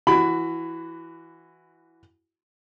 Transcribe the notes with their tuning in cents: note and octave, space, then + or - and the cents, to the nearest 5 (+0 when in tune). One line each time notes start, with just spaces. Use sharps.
E3 +10 F#4 +0 B5 +20